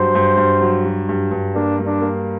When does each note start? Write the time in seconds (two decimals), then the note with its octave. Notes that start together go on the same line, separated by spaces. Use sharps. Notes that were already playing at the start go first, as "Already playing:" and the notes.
Already playing: G2 F#3 C5
0.15 G2
0.37 G2
0.61 F#3
0.85 F#3
1.09 G2
1.31 G2
1.55 A#3 D4
1.79 G3
1.87 D4
2.02 A#3